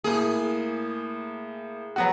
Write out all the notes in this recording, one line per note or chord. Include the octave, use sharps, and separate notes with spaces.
A2 A#3 G#4
F#3 B3 F#4